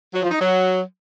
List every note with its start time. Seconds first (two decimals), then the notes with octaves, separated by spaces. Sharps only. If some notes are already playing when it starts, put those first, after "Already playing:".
0.14 F#3
0.23 F3
0.31 D#4
0.40 F#3